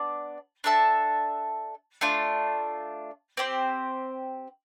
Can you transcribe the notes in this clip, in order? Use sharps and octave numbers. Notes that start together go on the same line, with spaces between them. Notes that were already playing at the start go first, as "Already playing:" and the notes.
Already playing: B3 D4 D5
D4 A4 E5 A5
A3 D4 F4
C4 G4 C5